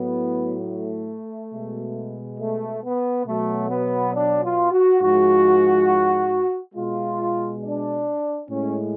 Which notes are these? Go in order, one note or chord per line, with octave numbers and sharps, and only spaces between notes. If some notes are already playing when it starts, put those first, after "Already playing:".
Already playing: A2 F#3 B3
A3
B2 G#3
A3
B3
B2 F#3 A3
B3
D4
F4
F#4
G#2 F3 G#3 F#4
B2 G#3 F4
D4
A2 G#3 C#4